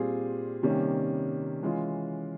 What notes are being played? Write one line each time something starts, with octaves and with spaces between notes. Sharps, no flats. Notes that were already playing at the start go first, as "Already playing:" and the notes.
Already playing: A#2 G3 C4 F4 G#4
C3 D#3 G3 A#3 C#4
E3 G#3 C#4 F4